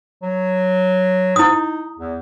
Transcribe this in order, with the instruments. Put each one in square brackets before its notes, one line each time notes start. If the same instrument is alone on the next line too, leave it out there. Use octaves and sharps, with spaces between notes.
[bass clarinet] F#3
[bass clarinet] G#2 [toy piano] E4 D#6
[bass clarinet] D#4
E2